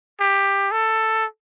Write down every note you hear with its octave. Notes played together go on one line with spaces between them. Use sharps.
G4
A4